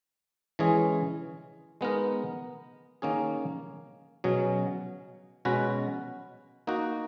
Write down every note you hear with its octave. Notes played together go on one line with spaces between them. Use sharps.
E3 G#3 C#4 G#4 C#5
G#3 B3 D#4 A#4
D#3 A#3 C#4 G#4
B2 F#3 C#4 G#4
B2 G#3 C#4 F#4 B4
A#3 D#4 F#4